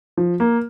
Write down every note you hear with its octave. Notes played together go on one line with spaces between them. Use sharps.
F3
A#3